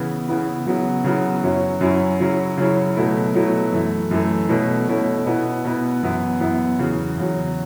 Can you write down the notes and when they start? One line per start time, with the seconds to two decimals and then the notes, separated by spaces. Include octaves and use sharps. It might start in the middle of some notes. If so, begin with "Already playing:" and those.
Already playing: C#3 E3 B3 E4
0.28 C#3 E3 B3 E4
0.66 C#3 F#3 B3 E4
1.04 C#3 F#3 B3 E4
1.43 F#2 F#3 C#4 E4
1.81 F#2 F#3 C#4 E4
2.20 C#3 F#3 C#4 E4
2.57 C#3 F#3 C#4 E4
2.97 B2 F#3 A3 E4
3.34 B2 F#3 A3 E4
3.72 F#2 E3 A3
4.11 F#2 E3 A3
4.49 B2 A3 C#4 E4
4.88 B2 A3 C#4 E4
5.26 B2 B3 E4
5.64 B2 B3 E4
6.03 F#2 E3 B3 E4
6.40 F#2 E3 B3 E4
6.79 E2 C#3 F#3
7.18 E2 C#3 F#3